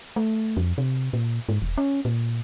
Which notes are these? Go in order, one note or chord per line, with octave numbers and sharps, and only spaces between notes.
A3
F2
C3
A#2
G#2
E1
C#4
A#2